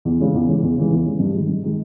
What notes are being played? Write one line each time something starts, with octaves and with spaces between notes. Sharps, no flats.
E2
C#3 E3 G#3
E2
C#3 E3 G#3
E2
C#3 E3 G#3
E2
C#3 E3 G#3
G2
D#3 G#3
G2
D#3 G#3